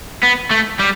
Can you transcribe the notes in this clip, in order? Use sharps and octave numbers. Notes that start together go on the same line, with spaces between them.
B3
A3
G3